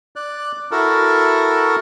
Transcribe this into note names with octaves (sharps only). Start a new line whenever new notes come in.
D5 F#6
E4 F#4 A4 A#4